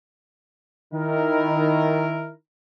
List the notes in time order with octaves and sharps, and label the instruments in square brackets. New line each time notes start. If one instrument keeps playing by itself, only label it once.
[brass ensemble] D#3 E4 A#4